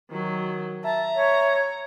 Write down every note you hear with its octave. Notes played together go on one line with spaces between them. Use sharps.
D#3 F#3
E5 A5 A#5
C#5